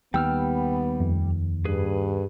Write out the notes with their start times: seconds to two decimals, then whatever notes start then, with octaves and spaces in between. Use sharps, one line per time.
0.14 D#2 G3 B3 G5 E6 F6
1.00 F2
1.65 G2 G#4 B4